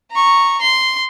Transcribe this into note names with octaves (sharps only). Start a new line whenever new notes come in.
A#5 C#6
C6